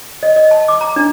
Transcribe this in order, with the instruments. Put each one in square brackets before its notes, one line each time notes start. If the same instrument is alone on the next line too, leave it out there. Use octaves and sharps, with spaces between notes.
[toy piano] D#5
D#5
A5
D6
A#5
D4